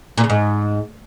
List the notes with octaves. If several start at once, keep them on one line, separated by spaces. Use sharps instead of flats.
A#2
C#3
G#2